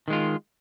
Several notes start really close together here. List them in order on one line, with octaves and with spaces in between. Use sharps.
D#3 G#3 F4